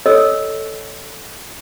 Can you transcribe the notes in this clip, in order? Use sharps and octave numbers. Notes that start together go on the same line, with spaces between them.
A4 C#5 D#5 E6